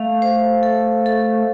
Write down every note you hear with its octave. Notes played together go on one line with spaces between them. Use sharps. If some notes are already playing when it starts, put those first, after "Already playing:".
Already playing: A3 F5
C5
A4
A4